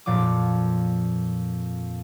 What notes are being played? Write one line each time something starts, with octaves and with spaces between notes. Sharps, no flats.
F2 A#2 F3 D6